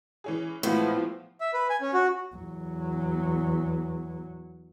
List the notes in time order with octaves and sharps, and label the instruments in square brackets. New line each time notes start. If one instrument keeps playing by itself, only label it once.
[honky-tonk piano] E3 C#4 G#4
[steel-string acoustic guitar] A2 [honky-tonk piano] E3 G#3 C4 [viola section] F3 [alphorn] B3
[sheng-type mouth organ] E5
B4
G#5
C#4
F#4
[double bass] E2 F#3